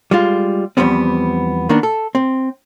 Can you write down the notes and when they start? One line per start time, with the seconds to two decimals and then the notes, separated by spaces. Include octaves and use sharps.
0.11 G3 G#3 F4
0.77 E2 G#2 F3 G3 B3 C4
1.69 D#3 A#3 B3 D4
1.83 A4
2.15 C4